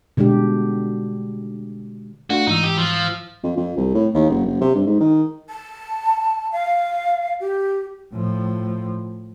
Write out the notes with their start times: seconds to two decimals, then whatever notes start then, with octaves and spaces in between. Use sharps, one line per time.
0.17 B2 D3 G#3 D4 G4
2.30 A3 D4 F4 F#4
2.47 G#2 E3 D#4 E6
2.63 G4
2.77 F3
3.43 F2
3.57 F2
3.77 C2
3.94 A2
4.14 D#2
4.30 F#1
4.46 F#1
4.61 C3
4.75 G2
4.86 G#2
5.01 D#3
5.49 A5
6.52 F5
7.40 G4
8.13 A2 F3